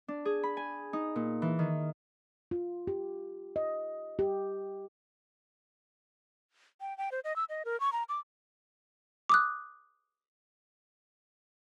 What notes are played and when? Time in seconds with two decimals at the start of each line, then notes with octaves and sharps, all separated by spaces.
0.08 D4
0.25 G#4
0.43 B5
0.57 G#5
0.93 D#4
1.16 A#2
1.42 E3
1.59 D#3
2.51 F4
2.87 G4
3.56 D#5
4.19 G4
6.81 G5
6.98 G5
7.12 C5
7.24 D#5
7.36 E6
7.49 D#5
7.65 A#4
7.80 C#6
7.92 A#5
8.09 D6
9.30 D6 D#6 F#6